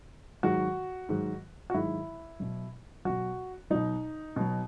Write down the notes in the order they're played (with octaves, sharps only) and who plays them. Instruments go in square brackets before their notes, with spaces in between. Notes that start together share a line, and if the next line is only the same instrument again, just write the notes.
[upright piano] G#2 D#3 F#3 F#4
G#2 D#3 F#3
F#4
G#2 D#3 F#3 E4
B2 F#3
B2 F#3 F#4
B2 F#3 D#4
B2 F#3